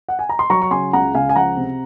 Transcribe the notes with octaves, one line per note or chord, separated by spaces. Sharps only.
F#5
G#5
A#5
C6
F#3 A#5 C#6
C#6
C#3 G#5 C6
C#2 F#5 A#5
C#2 F5 G#5
G#5
F3 F#5 A#5
C3